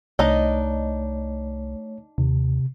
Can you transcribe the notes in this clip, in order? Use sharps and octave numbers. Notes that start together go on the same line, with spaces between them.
C2 A3 D4 D#4 C#5 D#5
D#2 C3